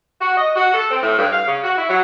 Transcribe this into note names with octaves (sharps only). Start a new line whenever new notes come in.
F#4
D#5
F#4
A4
C4
A2
G2
F5
C#3
F#4
E4
F#3